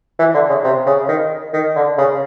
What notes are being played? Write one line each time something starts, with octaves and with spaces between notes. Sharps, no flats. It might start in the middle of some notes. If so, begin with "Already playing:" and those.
E3
D3
C#3
C3
C#3
D#3
D#3
D3
C#3